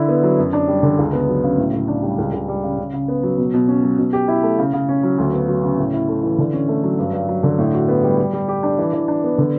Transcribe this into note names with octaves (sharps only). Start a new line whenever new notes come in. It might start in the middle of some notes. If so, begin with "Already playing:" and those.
Already playing: D3 E4
B3
F#3
F#2
D4
G3
D3
C#2
B3
F#3
C#3
A2
A2
D4
G3
C#2
C#2
G3
C#3
C#3
C#3
B3
F#3
B2
B2
C#4
F#3
B2
G4
E4
A3
C#3
C#3
C#4
F#3
D2
B3
F#3
C#3
A2
E4
A3
E3
D3
C#4
A3
F#3
G2
G2
F#3
D3
A2
F#4
B3
G3
G3
G3
G4
D4
E3
E3
D4
B3
D3